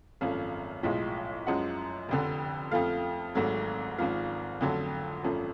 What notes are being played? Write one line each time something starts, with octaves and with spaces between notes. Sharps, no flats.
G#1 F#2 F3 A3 F5
B1 A2 F3 G#3
F#2 F3 G#3 F#5
F1 F2 D3
F2 F3 A3 F5
G#1 G#2 F#3 A3
G#1 G#2 F3 F5
F2 D3 F#3 A3
G#1 F#2 F3 A3